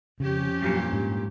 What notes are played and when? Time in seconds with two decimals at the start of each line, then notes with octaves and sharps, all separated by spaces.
0.20 F2 C#3 C#4 G4
0.62 G2 A#2 F#3
0.92 G#2